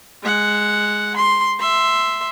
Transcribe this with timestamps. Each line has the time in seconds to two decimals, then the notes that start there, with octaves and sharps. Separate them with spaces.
0.23 G#3 F#5
1.16 C6
1.59 E5 C6